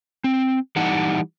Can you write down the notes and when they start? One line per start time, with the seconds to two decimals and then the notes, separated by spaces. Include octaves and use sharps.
0.24 C4
0.76 E3 G3 D#4 F#5 A5